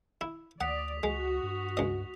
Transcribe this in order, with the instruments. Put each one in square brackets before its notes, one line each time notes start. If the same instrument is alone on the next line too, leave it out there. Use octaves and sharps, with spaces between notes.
[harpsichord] E4
[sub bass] D2 [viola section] D5 [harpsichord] F#5 [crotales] D#6 B6 F7
[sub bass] C#2 [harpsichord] G#3 [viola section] F#4 [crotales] F7
[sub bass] G2
[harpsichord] C#2 D#5